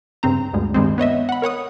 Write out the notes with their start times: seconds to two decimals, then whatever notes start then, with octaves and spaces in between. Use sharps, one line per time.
0.23 G2 C#3 C4 A#5
0.53 D2 G2 G#3
0.74 G2 D#3 G#3 C4
0.98 B3 C#5 D#5 E5
1.29 F#5 B5
1.42 A#4 C#5 F#5 D#6